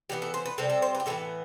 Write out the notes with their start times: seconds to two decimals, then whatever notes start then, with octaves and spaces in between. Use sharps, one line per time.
0.09 E3 G3 B3 G4
0.22 A4
0.34 C5
0.46 B4
0.58 C3 G3 C4 A4
0.70 A4
0.82 C5
0.95 B4
1.00 G4
1.06 A2 E3 B3 A4